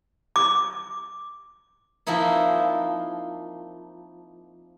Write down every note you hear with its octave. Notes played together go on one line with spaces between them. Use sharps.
D6
F3 A#3 C4 D#4 E4